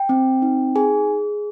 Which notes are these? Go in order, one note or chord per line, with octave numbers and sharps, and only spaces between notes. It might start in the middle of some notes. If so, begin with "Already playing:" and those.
Already playing: G5
C4
D#4
G#4 G#5